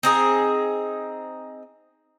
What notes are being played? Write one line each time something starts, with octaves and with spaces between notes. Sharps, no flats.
C4 D#4 G#4